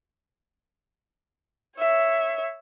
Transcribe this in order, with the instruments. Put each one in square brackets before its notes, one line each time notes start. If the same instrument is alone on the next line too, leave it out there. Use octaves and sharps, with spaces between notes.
[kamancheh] C#5 E5